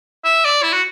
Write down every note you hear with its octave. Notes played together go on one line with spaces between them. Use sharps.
E5
D5
E4
F#4